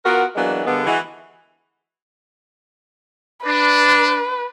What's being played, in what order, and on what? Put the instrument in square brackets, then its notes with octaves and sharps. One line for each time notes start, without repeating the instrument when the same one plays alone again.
[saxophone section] B3 F4 F#4 A#4
E3 F#3 G#3 A#3 B3 D4
D3 G3 G#3 A#3 B3
E3 G#3 F#4
[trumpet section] D4 [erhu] B4